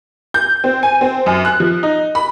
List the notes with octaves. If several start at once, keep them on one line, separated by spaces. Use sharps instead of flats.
G6
C4
G#5
C4
F#2
F#6
F3
D#4
B5